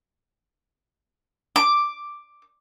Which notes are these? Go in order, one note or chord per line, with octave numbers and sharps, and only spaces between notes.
D6